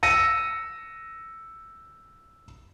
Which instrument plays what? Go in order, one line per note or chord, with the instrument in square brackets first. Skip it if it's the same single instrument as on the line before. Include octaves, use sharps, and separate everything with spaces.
[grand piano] E6 A#6 C#7 D#7